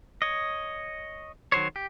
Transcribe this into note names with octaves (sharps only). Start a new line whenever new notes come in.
C#5 D#5
D#3 F#3 C5 C#5
G4